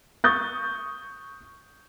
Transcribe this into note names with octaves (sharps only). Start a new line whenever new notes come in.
C#6 D#6 G6 A6